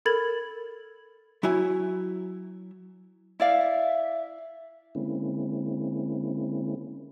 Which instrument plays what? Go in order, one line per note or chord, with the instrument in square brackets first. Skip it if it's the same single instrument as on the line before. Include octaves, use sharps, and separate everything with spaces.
[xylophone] A4 A#4 B5 G#6 A6 F#7
[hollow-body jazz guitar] F#3 E4 C#5 G#5
[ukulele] E4 D5 F5 [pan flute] E5
[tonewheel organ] D3 G#3 A#3 C4 C#4 E4